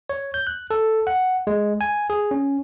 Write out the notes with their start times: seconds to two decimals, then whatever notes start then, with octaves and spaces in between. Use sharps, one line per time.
0.09 C#5
0.34 G6
0.47 F#6
0.71 A4
1.07 F#5
1.47 G#3
1.81 G#5
2.10 G#4
2.31 C#4